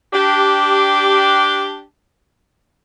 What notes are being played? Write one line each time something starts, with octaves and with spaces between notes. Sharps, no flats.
D4 G4